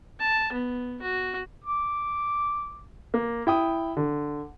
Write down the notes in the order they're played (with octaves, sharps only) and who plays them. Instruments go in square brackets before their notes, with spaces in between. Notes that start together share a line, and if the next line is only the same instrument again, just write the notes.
[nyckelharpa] A5
B3
F#4
[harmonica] D6
[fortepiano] A#3
E4 G5 D#6
D3